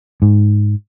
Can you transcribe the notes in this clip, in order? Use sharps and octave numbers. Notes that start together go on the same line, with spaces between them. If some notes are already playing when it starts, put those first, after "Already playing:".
G#2